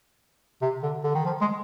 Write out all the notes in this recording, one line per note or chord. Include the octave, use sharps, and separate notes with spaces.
C3
D3
D3
D#3
F3
G#3